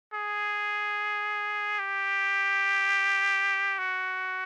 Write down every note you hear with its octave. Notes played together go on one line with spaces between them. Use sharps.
G#4
G4
F#4